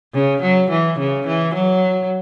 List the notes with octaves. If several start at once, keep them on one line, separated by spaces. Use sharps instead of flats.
C#3
F#3
E3
C#3
E3
F#3